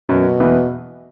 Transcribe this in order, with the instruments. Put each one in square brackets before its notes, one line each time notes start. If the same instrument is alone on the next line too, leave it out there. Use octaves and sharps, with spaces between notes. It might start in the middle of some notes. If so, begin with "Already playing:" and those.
[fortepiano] F#2 F#3 [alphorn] B2
[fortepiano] E2 E3